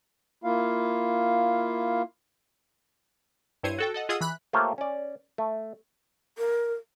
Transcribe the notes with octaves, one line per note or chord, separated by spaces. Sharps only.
A#3 E4 F4 F5
G2 E4 C5 C#5 G#6 D#7
F#4 A4 G5
A4 D#5 F#5
F4 G#4 D#5 F#5 D#6 E6
E3 B5 F#6
A3 A#3 F4 G4 C5 C#5
C#4 D5
A3
A#4